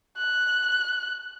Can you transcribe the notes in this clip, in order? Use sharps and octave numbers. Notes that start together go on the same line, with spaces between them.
F#6